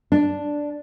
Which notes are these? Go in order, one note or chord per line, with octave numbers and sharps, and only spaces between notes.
D4